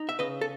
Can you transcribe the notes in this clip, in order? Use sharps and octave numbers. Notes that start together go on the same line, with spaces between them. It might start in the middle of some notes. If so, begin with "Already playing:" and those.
Already playing: D#4
E5
C#3 B4 D#5
A4